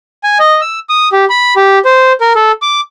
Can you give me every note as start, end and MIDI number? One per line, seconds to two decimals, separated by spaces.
0.23 0.38 80
0.39 0.61 75
0.61 0.79 88
0.89 1.08 87
1.12 1.25 67
1.30 1.54 83
1.56 1.79 67
1.85 2.13 72
2.21 2.33 70
2.35 2.52 69
2.62 2.81 86